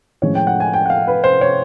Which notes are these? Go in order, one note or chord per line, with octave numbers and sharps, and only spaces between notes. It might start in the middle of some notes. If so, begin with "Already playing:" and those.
A2 F3 G#3 C#4 C#5
G5
F#5
G#5
G5
F#5
F5
B4
C5
C#5